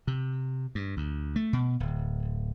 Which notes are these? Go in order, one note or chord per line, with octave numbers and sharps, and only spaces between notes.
C3
G2
D2
A3
B2
D1